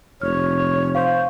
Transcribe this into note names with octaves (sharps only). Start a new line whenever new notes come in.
F1 C#5 F6
C5 F5 C#6